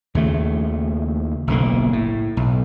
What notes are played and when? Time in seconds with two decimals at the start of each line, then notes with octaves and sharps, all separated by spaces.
0.15 D#2 C#3 A3
1.47 F#1 B1 D3 A#3
1.93 A2
2.37 B1